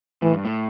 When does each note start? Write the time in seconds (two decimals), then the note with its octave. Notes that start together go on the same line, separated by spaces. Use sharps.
0.22 A2 E3
0.33 G2
0.45 A2